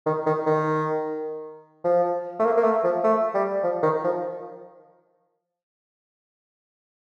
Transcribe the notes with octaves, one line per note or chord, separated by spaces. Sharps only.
D#3
D#3
D#3
F3
A3
A#3
A#3
A3
F3
A3
G3
F3
D#3
F3